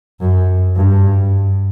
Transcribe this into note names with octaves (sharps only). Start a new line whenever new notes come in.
F#2
G2